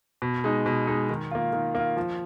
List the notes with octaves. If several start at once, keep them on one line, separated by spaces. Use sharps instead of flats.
B2
G#3 D#4
B2
G#3 D#4
D#3
A#3 F4
D#3
A#3 F4
F3